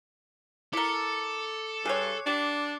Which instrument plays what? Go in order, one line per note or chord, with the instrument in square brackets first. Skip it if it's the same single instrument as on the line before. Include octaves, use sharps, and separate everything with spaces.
[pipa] E4 A#4 [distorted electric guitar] A4 [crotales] D6 C#7
[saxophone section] G2 [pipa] G#4 C#5 [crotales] F#6 C7
[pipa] G3 [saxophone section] D4